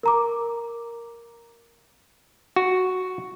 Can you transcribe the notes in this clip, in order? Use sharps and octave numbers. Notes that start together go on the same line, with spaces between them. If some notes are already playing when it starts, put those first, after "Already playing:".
A#4 A#5 D6
F#4